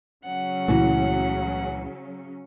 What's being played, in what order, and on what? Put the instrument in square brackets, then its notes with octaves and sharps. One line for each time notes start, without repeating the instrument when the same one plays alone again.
[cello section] C#3 F#3 C#4 [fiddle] F#5
[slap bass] C#2 A#2 A3 [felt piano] E3 F#4